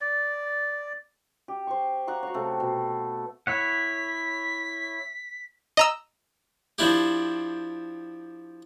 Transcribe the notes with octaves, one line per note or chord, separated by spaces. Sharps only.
D5
G4
C5 C#6
F5 F#5 A#5 C#6
F#4 C#5
C3 F3 A3
B2
E4 C#5 F#5 B6
D#5 A#5 E6
F3 C4 D4 E4 G4